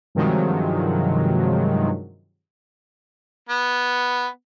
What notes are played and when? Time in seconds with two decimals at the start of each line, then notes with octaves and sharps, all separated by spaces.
0.15 G2 C3 D#3 F3 F#3 G#3
3.49 B3